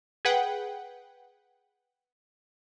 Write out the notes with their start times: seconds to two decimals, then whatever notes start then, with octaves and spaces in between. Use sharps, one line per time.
0.25 G#4 B4 F#5 G5